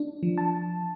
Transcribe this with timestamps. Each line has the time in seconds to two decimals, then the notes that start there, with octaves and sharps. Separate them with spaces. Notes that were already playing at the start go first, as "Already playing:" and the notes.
Already playing: D4
0.23 F3
0.38 A5